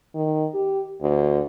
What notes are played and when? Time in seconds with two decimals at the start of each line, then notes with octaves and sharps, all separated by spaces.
0.15 D#3
0.54 G4
1.02 D2